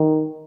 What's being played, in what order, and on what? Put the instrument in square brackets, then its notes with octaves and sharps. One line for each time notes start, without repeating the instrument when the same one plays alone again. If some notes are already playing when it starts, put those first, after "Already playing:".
Already playing: [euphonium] D#3